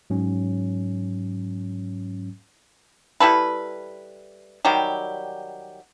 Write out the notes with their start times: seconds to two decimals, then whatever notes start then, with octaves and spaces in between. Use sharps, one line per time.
0.10 G#2 F#3 C#4
3.20 G3 E4 A4 B4
4.65 D#3 F#3 G3 G4